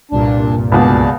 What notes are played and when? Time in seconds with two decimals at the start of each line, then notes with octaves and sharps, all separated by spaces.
0.11 C2 G2 A#2 D4
0.72 C#2 B2 G#4 D5 A5